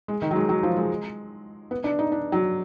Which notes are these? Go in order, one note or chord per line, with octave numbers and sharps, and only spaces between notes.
G#3
D#3
F#3
G#3
F#3
F3
G#3
B3
D4
D#4
D4
F#3